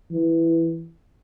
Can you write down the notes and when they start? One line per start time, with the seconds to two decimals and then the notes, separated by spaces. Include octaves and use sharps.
0.12 E3